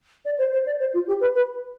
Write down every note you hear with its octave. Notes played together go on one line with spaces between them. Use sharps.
D5
C5
C5
D5
C5
F4
G4
B4
B4